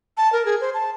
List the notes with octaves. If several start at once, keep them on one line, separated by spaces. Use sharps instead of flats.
A5
A#4
G#4
C5
A5